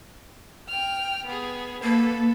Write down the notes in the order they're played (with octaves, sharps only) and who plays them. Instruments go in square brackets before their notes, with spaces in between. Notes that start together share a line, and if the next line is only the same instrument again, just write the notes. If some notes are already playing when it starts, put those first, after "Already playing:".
[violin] G5 F6
B3 G#4
[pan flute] A#3 [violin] A4 B4